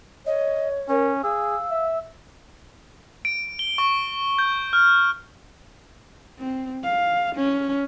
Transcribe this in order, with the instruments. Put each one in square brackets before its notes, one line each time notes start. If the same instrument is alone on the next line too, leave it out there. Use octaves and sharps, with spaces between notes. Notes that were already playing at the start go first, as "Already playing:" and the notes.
[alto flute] C#5 [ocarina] D#5
[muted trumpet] C#4 [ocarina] A#4
[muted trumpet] G#4 [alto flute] F5 [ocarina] E6
[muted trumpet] E5
[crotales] D7
G7
C#6
G6
F6
[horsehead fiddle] C4
F5
C#4